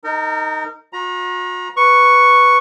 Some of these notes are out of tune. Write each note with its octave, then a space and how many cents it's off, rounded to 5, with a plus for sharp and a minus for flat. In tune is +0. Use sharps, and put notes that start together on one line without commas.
D#4 +0 A#4 -35
F#4 -40 A#5 +25
B4 +0 C#6 +0